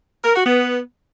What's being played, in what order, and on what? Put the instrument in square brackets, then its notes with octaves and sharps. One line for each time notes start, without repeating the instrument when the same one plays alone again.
[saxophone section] A#4
F#4
B3